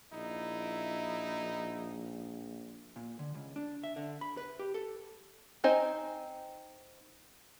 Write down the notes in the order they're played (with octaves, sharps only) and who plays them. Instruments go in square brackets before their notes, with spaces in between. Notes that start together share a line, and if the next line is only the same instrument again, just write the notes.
[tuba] A#1 [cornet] D#4 [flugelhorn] E4
[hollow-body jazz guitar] A#2
D3
C#2
D4
E5
D3
B5
B4
G4
A4
[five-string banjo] C4 D#4 C5 D#5 G#5